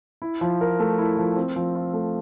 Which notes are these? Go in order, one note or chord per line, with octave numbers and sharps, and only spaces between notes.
E4
F3
A#4
A3
E4
F3
C4
F3
F4
A3